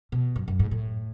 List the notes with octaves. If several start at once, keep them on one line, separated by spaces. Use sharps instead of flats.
B2
F#2
F#2
G#2
A2